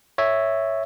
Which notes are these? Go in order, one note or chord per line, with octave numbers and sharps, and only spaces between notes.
C#5 E5